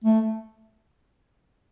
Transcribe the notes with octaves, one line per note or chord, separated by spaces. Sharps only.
A3